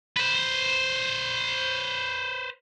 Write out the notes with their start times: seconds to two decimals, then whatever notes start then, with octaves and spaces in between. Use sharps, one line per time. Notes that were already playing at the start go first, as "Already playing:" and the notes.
0.17 B4 C5